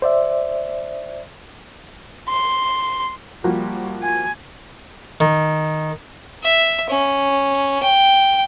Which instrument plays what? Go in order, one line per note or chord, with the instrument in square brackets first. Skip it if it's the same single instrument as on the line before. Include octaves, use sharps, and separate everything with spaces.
[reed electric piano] C5 D5 E5
[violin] C6
[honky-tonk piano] F3 A#3 F#4 [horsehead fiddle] G3
[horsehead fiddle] G#5
[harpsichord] D#3
[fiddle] E5
C#4
G5